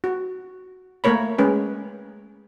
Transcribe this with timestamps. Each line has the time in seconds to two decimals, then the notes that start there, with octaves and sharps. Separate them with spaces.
0.04 F#4
1.04 A3 A#3 A#4 C#5 B5
1.38 G#3 C#4 B4